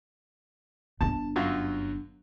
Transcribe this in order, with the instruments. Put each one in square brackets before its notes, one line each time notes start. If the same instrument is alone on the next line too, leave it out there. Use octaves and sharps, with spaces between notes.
[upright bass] G1 D4 [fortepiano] A5
[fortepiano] F#2 F#3 F4